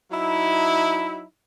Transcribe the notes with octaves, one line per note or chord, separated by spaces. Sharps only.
F#3 D#4 E4